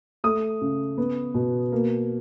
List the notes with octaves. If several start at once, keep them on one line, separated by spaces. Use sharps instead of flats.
A3 D#6
C#3
B3
B2
A#3